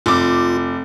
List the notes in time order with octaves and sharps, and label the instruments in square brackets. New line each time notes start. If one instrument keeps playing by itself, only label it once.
[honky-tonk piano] F1 D6 [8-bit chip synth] F4